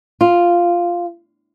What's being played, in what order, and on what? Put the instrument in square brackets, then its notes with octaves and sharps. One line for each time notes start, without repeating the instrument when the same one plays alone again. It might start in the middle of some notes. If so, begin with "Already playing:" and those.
[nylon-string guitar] F4